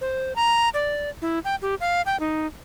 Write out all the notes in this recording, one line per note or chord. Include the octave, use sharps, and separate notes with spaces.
C5
A#5
D5
E4
G5
G4
F5
G5
D#4